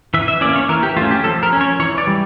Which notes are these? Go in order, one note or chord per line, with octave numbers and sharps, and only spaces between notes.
E3 E5
E5
A#3 C#4 D5
C#5
E3 A#4
G4
A3 C#4 F4
G4
F3 A4
A#4
C#4
C#5
E3 C#5
D5
G3